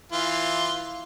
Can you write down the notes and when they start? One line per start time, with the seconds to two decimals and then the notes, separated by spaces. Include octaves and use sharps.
0.12 E3 F4